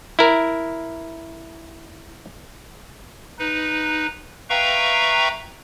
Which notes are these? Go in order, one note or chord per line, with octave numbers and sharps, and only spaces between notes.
E4 A#4
D#4 B4
B4 E5 F5 G5 A#5 C#6